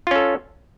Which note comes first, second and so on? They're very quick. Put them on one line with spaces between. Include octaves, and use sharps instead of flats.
F4 C#4 A4